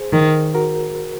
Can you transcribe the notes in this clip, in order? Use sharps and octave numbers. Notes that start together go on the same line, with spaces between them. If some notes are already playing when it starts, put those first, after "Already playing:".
Already playing: G#4 C5
D#3
F#4 A#4